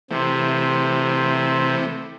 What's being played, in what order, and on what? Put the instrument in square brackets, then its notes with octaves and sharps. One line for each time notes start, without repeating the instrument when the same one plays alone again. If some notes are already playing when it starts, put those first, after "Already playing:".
[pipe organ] C3 [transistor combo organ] E3 A3 C4